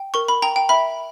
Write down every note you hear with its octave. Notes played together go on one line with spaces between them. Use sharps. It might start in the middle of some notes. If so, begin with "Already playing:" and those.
Already playing: G5
A#4 C#6
B5
G5 A#5
G5
E5 B5